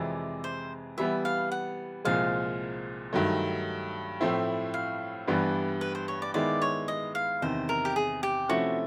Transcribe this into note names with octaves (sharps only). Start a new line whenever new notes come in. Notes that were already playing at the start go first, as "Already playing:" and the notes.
Already playing: F2 C3 E3 G#3 D5
C5
E3 G3 B3 E5
F5
F#5
C2 A#2 F3 G#3 F5
G2 D#3 F#3 A3
A2 F3 A3 C4 E4
F5
G2 E3 G3 B3 D4
B4
C5
C#5
D5
D#3 G#3 B3 E4 D5
C#5
D#5
F5
E2 C3 D#3 C5
A#4
G4
G#4
G4
C3 F3 A3 C#4 E4 F#4